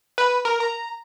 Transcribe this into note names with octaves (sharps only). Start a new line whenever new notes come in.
B4
A#4
A#5